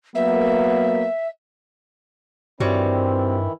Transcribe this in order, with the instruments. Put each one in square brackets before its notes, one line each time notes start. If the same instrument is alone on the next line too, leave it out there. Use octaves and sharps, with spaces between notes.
[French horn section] F#3 A#3 B3 [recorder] E5
[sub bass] G2 [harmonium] D#3 E3 E4 [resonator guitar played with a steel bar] G3 F#4 C#5 [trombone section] C4